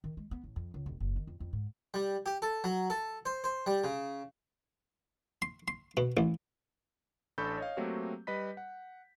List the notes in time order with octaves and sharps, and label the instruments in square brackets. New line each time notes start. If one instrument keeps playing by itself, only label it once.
[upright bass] D#3
G#3
B3
A1
F2
C#2
E1
F#1
D#3
F2
F2
G#2
[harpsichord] G3
G4
A4
F#3
A4
C5
C5
G3
C#3
C6
C6
B2
A1
[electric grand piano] A1 D4 A4 B5 C#6 G6
C#5 D#5 F5
F#3 A3 A#3 C4 F#4 G4
G3 B4 D#5 B5 B6
F#5